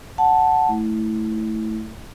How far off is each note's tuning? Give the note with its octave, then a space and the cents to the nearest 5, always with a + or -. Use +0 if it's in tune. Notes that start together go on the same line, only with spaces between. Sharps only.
F#5 +0 A5 +0
A3 +0 E4 -15